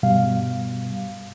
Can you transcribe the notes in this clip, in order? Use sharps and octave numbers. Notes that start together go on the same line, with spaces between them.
G2 B2 G3 F5